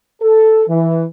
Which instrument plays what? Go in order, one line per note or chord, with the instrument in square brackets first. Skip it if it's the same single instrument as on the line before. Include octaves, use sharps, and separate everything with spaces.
[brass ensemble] A4
E3